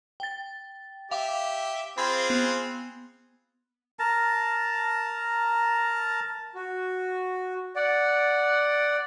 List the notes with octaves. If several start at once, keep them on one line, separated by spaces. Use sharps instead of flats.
G5 A6
G4 E5 F5 D6
C4 F4 G#4 B5 G#6
B3
A#4 A5 A#5
F#4
D5 F#5